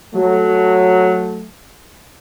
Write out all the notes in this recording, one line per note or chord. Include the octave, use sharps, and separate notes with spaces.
F#3 A3